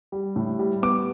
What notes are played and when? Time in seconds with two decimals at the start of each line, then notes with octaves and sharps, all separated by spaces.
0.12 G3
0.36 A2
0.59 G3
0.82 B3 D6